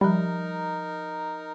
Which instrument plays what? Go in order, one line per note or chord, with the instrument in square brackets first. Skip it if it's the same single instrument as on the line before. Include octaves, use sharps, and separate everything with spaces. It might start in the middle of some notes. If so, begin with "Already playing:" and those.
[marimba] F3 B5 [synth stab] G3 [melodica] D#4 A#4